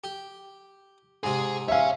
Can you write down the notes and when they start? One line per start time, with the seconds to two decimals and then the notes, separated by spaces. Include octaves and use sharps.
0.04 G4
1.23 G#2 C3 G#4
1.68 C#5 E5 F5 G#5